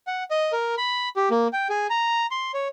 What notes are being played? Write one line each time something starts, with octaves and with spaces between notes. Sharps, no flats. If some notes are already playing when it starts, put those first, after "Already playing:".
F#5
D#5
A#4
B5
G4
A#3
G5
G#4
A#5
C6
C#5